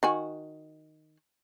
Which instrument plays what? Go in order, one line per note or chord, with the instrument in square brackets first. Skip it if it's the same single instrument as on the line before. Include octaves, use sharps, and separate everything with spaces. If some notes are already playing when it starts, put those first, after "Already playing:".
[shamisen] D#3 F#4 G#5